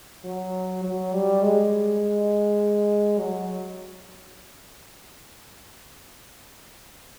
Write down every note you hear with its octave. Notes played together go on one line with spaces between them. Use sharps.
F#3
F#3
G3
G#3
F#3